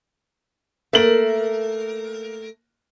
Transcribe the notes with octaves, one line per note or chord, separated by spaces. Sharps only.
A3 A#3 A#4 F#7